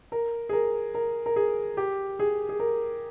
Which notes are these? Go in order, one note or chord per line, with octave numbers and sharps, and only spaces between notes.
A#4
G#4
A#4
A#4
A#4
G#4
G4
G#4
G#4
A#4